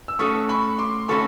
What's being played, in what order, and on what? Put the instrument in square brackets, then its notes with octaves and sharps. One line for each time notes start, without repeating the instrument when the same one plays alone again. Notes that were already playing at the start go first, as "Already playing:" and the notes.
[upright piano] E6
[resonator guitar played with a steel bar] A3 C#4 F#4 A4 [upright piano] C#6 D#6
[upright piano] B5 C#6
C6 D6
[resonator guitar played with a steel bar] A3 C#4 F#4 A4 [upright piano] B5 C#6